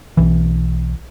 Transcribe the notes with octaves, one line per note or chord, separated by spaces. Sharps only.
B1 E3